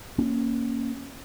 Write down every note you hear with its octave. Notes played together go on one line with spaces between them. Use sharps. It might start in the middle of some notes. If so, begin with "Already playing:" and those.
A#3 C#4